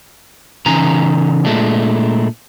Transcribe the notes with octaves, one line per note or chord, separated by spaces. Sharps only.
C#3 E3 C#4 D#4 G#5 A#5
A#2 G#3 A3 D4